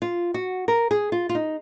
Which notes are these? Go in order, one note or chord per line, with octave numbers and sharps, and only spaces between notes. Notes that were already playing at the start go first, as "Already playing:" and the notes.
F4
F#4
A#4
G#4
F4
F4
D#4